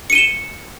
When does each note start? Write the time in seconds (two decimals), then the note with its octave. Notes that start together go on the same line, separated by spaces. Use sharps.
0.10 C#7
0.12 D#7
0.15 G7
0.18 E7